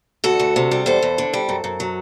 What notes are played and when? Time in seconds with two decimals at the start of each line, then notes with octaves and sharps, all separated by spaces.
0.24 D2 F#4 A4
0.40 D2
0.56 C3
0.71 G3
0.86 E2 A4 C5
1.03 E2
1.18 D3
1.33 G3
1.49 F#2
1.64 F#2
1.80 F#3